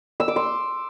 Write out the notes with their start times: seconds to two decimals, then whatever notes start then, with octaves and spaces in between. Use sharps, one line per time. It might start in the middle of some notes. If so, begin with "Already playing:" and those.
0.20 E6
0.28 D6
0.36 C6